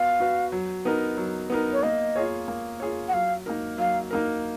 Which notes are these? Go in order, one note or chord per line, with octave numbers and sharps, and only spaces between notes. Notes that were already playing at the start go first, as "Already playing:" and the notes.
Already playing: B3 F#4 F5
F#4 B4
F#3
B3 D#4 A#4
F#3
B3 D#4 A#4
C#5
A#3 D#5
F4 G#4 C#5
A#3
F4 G#4 C#5
F#5
F#3 F5
A#3 D#4 A#4
F#3 F5
A#3 D#4 A#4